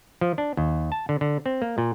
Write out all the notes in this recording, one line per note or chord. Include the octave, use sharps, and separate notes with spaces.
F3
D4
D#2
A5
D3
D3
C4
A#3
A#2